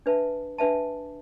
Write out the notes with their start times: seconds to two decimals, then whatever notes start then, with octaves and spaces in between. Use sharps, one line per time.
0.06 D4 B4 E5 A5
0.58 D4 B4 E5 A5